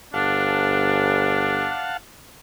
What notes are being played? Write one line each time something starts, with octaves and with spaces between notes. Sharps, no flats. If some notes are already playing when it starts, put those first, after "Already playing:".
G1 D4 F5 F#5 A5